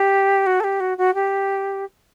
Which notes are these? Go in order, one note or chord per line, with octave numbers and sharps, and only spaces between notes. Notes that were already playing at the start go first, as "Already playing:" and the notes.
Already playing: G4
F#4
A4
G4
F#4
F#4
G4